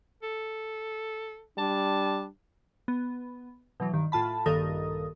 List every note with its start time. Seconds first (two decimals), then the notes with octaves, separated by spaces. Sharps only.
0.23 A4
1.58 G3 D4 A5
2.88 B3
3.80 B2 E3 F#3
3.93 G2 D#3
4.12 A2 F4 A5 B5
4.46 A#1 G2 D#3 A4 A#4 D#6